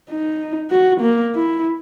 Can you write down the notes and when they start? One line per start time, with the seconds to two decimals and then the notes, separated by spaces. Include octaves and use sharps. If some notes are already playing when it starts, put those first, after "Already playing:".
0.10 D#4
0.70 F#4
1.00 A#3
1.35 E4